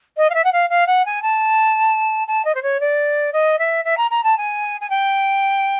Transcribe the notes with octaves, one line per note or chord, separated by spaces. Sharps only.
D#5
F5
E5
F#5
F5
F5
F#5
G#5
A5
A5
D#5
C5
C#5
D5
D#5
E5
E5
A#5
A#5
A5
G#5
G#5
G5